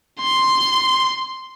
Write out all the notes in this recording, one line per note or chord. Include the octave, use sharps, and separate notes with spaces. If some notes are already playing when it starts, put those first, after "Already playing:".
C6